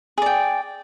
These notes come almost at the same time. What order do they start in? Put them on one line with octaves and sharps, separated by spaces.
G#4 D5 G5